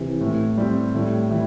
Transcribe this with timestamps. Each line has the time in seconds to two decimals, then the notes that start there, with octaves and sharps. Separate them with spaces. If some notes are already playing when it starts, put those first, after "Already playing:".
Already playing: C3 E3
0.21 A2
0.58 G3 C4
0.94 A2 D3 G3
1.31 E3